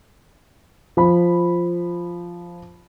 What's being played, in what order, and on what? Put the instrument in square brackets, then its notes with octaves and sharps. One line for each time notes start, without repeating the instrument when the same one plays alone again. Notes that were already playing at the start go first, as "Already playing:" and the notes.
[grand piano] F3 B5